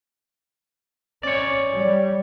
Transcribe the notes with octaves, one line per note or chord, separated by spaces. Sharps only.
C#4 C#5 D5
G3